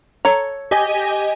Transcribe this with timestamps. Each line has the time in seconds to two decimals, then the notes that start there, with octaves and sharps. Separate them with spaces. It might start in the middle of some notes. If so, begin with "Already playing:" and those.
0.25 A4 C#5 A#5
0.71 G4 D#5 G#5